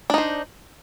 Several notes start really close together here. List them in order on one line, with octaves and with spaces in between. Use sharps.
D4 D#4 C5